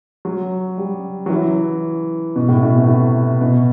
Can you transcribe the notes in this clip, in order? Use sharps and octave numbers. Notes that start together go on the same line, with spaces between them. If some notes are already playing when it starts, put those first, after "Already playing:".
F#3
G3
F#3
E3
B2
A2
B2
C3
A2
B2